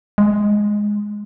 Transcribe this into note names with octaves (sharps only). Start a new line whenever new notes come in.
G#3